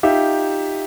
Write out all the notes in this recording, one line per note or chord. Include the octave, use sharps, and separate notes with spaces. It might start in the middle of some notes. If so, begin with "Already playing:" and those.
D#4 F4 G4 E5